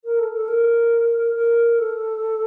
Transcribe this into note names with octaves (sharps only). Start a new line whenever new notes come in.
A#4
A4
A4
A#4
A#4
A4